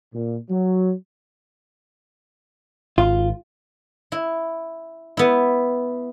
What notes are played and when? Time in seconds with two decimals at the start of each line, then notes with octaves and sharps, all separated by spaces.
0.13 A#2
0.50 F#3
2.98 G#1 F4
4.12 E4
5.17 B3 E4